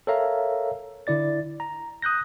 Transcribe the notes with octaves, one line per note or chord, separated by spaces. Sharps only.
A4 A#4 C#5 E5 F5 A#5
D3 E4 D5 A6
A#5
D#6 F#6 G6 A#6